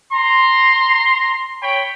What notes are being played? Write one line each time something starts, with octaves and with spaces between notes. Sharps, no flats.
A#5 C6
C#5 G5 B5